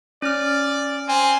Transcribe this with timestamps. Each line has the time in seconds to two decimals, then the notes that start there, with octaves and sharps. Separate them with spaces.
0.22 C#4 D5 F6
1.08 C4 G#5